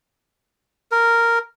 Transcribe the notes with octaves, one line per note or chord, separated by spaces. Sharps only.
A#4